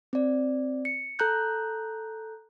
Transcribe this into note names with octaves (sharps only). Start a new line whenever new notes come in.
C4 D5
C#7
A4 A#5 F#6 G6